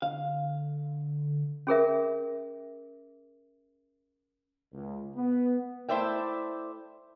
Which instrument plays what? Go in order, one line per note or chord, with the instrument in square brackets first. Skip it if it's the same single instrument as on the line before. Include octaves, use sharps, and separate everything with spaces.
[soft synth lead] D3 [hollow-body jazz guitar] F5
[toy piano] C#4 G#4 A#4 E5
[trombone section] C#2
B3
[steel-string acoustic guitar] A3 E4 C5 D5 E5 G5